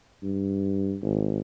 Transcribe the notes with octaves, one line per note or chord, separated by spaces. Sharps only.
G2
G#1